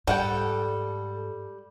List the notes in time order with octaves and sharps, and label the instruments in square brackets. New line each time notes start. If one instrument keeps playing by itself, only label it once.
[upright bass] G#2 [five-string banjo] G3 F#5 G5 [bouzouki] A4